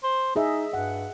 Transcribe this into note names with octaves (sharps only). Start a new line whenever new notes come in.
C5
D#4 G#4 D#5 E5
G2 F#5